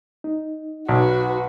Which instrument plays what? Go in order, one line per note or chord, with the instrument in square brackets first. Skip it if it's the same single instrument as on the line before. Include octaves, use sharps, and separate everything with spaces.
[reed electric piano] D#4
[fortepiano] B1 [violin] F#4 B4